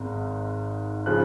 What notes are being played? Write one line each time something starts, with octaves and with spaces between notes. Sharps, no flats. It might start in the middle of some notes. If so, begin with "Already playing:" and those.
Already playing: G#1 G#2
C#3 F3 F#6